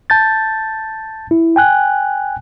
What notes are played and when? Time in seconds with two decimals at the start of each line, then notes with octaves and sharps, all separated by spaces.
0.10 A5 G6 A6
1.31 E4
1.56 G5 G#5 F#6